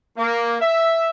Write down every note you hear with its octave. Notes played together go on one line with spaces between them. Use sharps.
A#3
E5